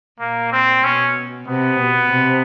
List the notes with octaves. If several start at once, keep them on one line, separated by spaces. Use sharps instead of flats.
A#2 A#3
C4
B2 C#4
C3 B3
B2
C3